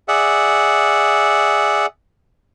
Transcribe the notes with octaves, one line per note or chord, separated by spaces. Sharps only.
G#4 D5 E5 F#5